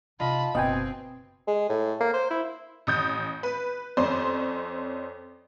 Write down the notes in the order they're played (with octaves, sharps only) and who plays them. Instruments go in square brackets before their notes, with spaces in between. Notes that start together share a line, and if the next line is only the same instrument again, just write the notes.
[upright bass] C3 D#4 [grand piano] F4 D#5 [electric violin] A5 B5
[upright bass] F#1 E4 [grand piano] B2 [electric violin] C4 [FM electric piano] D#5 G5 G#5
[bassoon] G#3
A2
A#3
C5
E4
[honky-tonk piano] A1 D#6 G6
B4
F2 C#4 C5 D5 C6